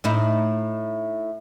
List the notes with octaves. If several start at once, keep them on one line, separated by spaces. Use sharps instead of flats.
A2 D#4 E4